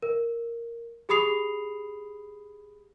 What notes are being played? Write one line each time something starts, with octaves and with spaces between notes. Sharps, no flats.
A#4
G4 G#4 B5 D#6 C7 F7